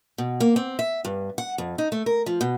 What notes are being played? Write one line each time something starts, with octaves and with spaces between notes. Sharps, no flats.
B2
A#3
C4
E5
G2
F#5
F2
D#4
A3
A#4
F3
B2